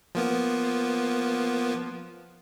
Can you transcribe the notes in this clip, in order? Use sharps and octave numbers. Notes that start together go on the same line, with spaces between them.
F3 A#3 B3